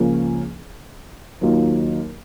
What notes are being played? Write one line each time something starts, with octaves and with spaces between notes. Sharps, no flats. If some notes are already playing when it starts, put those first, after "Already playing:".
Already playing: C#2 C#3 F3 A#3 C#4
D#2 D#3 F#3 A#3 F4